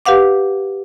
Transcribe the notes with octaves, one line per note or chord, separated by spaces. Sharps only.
G4 B4 F5 F#5 D6